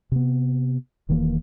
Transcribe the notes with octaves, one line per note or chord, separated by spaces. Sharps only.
C3 B3
E1 D#3 E3 A#3